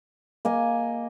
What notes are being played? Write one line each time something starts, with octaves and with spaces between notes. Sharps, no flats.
A#3 D#5 G#5